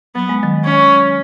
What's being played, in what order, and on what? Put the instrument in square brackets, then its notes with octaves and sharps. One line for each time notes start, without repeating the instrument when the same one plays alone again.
[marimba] F#3 [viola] B3
[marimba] G#3
D#3 F#3
[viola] C#4